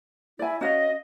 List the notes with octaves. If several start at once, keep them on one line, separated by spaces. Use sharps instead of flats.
E4 D5 G#5
C#4 F#4 D#5 F5